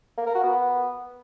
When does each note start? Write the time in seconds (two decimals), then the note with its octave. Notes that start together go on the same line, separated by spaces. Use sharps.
0.17 A#3
0.26 A#4
0.35 F#4
0.43 B3